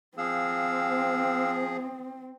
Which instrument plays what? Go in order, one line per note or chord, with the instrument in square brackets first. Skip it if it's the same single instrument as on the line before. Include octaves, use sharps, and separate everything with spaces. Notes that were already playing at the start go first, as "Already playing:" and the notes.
[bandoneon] F3 G#4 [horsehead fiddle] C4 [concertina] F5 E6